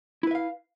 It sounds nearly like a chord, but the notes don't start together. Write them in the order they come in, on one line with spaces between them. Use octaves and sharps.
E4 B4 E5 F5